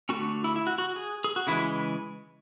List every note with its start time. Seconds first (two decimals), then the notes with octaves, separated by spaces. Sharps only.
0.09 D3 A3 C#4 F#4
0.44 E4
0.56 E4
0.67 F#4
0.78 F#4
0.96 G#4
1.24 G#4
1.36 F#4
1.47 C#3 E3 G#3 E4